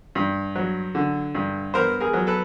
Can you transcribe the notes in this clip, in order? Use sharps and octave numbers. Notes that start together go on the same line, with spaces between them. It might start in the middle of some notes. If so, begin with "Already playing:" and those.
G2
F#3
D3
G2
B3 A#4 C5
G#4 A#4
F#3
A4 B4